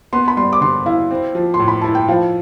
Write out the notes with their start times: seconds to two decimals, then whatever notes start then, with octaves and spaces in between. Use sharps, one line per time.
0.13 B3 C6
0.28 B5
0.37 G3 C6
0.53 D6
0.61 D3 C6
0.86 E4 F5
1.11 C4
1.35 F3
1.54 C6
1.59 A2
1.68 B5
1.81 E4 A5
1.95 G5
2.08 F3 F5